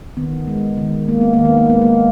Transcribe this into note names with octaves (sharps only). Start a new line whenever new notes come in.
D#3 B3
G#3
D#3
G#3 A#3
B3
D#3 A#3
B3
A#3
G#3 B3
A#3